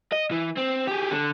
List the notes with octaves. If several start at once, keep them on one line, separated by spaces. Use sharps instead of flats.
D#5
E3
C4
G4 G#4
D3